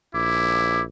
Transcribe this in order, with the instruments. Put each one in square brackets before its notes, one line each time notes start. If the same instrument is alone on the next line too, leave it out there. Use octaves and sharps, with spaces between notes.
[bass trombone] A#1 [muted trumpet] E4 [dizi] D6